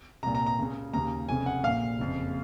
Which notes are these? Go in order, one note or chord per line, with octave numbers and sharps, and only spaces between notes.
C2 A#2 A#5
A#5
A#5
C#2 C#3
D#2 C#3 A#5
F1 F2 C#3 G#5
F#5
A#1 A#2 F5
F#1 F2 C#3